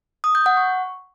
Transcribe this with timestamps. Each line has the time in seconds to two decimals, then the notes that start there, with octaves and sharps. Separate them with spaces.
0.24 D#6
0.35 G6
0.46 F#5
0.57 C#6